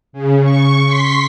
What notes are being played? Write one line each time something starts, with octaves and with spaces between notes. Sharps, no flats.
C#3
C#6
C6 B6